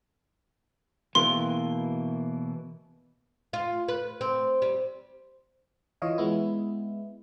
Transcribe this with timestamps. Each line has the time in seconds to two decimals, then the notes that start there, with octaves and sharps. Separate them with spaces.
1.15 B2 E3 A#3 C6
3.53 F4
3.88 B4
4.21 C4
4.62 G3
6.02 E3 F4 C#5 D#5 F5
6.18 G#3 B3 E4